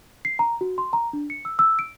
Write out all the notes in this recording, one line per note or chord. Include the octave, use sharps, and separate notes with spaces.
C7
A#5
F#4
C6
A#5
D4
C#7
E6
E6
D7